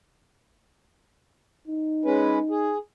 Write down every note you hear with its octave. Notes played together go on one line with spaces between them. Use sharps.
D#4
G#3 C#4 B4
G#4